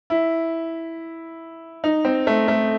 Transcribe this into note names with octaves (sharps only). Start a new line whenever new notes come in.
E4
D#4
C4
A3
A3